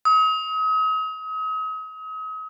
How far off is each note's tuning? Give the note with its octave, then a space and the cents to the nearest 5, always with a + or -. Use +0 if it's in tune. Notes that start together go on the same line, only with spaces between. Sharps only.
D#6 +40